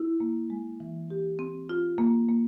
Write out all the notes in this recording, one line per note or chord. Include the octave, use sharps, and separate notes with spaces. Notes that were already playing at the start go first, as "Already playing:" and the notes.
Already playing: E4
A#3
G#3
E3
G4
C4
F4
A#3
A#3